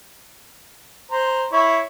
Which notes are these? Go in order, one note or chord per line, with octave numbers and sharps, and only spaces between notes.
C5 A#5
E4 C#5